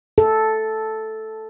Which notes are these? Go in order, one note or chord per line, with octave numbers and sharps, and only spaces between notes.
A4